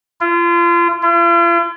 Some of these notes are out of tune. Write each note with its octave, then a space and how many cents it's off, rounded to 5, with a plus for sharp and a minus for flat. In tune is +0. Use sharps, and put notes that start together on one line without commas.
F4 -35
F4 -45